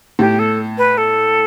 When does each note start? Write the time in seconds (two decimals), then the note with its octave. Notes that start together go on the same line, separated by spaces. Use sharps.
0.19 A2 G4
0.39 A4
0.78 B4
0.98 A4